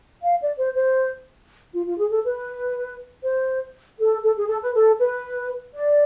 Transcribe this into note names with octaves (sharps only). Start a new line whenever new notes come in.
F5
D5
C5
C5
F4
F4
G#4
A4
B4
C5
A4
A4
G#4
A4
B4
A4
B4
D5